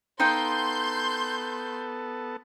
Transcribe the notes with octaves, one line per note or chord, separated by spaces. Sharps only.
B3 D#4 A4 F5 G5 C6 G6